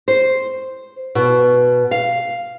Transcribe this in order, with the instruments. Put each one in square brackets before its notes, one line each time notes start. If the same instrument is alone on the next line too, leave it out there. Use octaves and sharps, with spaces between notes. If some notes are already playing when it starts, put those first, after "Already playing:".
[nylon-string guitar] C5
B2
F5